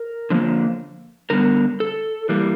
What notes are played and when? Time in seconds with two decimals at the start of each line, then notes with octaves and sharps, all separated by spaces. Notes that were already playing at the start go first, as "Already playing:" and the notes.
Already playing: A#4
0.30 D3 F3 A#3
1.30 D3 G3 B3 A#4
1.80 A4
2.29 E3 G3 A#3